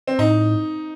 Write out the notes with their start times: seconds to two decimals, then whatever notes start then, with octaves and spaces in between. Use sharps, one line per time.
0.07 C4
0.19 A2 D#4